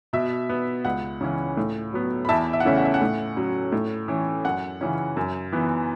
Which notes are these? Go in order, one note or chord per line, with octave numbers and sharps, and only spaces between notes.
B2 E5
B3
C#2 F#5
C#3 E3 C#4
A2
F#3 B3
B5
E2 E5 A5
E5
F#5
C#3 E3 A3 C#4 E5
F#5
E5
F#5
A2
F#3 C#4
A2
E3 C#4
F#2 F#5
C#3 E3 C#4
F#2
E3 B3